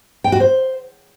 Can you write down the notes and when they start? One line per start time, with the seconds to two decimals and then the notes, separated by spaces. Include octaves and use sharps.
0.24 G5
0.32 F#4
0.40 C5